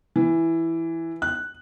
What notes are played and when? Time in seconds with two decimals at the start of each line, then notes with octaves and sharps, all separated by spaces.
0.16 E3
1.22 F#6